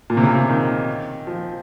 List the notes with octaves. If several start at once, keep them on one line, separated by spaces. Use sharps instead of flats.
A#2
C3
C#3
C3
D#3
F3